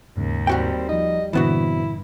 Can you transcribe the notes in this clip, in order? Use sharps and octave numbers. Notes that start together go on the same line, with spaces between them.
D#2 G#2 C#3
G3 C4 F#4 G5
F3 D#4 D#5
C2 G2 A#2 D3 E3 B3 E4 F#4